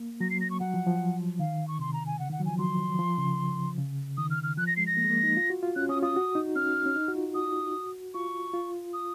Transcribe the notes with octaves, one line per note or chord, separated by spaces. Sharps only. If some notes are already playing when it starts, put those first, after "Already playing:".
Already playing: A#3
F#3 A#6
C7
A#6
C#6
F#3 F#5
F3
F3
D#3 F5
C#6
C3 C6
A#5
G#5
C#3 F#5
D#3
F#5
F#3
F3 G#5
F#3 C6
F3
C#3
C#3
D#3 D#6
F6
F6
F3 F#6
A#6
G#3 C7
A#6
A#3
G#3
A#3
D#4
F4
F#4
F4
C#4 F#6
C#4 D#6
F4 D#6
F#4
D#4
C#4 F6
C#4
D#4
F#4
F4
F#4 D#6
F4 C#6
F4
D#6